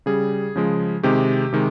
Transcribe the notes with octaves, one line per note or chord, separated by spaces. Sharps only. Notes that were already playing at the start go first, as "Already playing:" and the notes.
C#3 G3 G#4
C#3 F3 G#3
C3 D#3 G#3 G4
C3 D#3 G#3